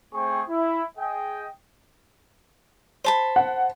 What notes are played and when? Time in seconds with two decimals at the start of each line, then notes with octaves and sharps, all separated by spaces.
0.13 A3 C4 G#4 C5 G5 C#6
0.49 E4
0.98 G#4 D#5 G5
3.04 C5 A5 B5
3.36 F#5